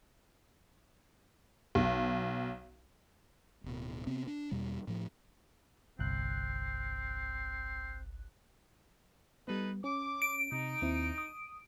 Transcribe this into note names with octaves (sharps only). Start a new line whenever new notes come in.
B1
D1 B2
C3 B3 C4
D4
E2 B2 G3
A2 F3
G1 C2 C4 F#6
G3 B3 D#4 A4 B4
C#4 D6
D7
C3 D#4
D#2 C4 E4
D#6